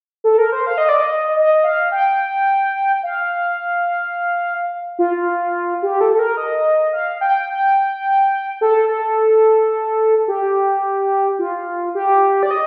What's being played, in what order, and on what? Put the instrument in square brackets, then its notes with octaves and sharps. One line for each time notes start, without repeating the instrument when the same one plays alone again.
[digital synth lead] A4
A#4
C5
F5
D#5
D5
D#5
D#5
F5
G5
F5
F4
G4
A4
A4
A#4
D#5
F5
G5
G5
A4
A4
G4
F4
G4
D5
D#5